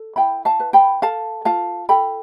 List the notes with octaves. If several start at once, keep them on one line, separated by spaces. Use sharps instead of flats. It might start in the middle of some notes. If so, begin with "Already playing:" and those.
Already playing: A4
E4 G5 B5
F5 A5
B4
G5 B5
A4 F5 A5
F4 F5 A5
A4 G5 B5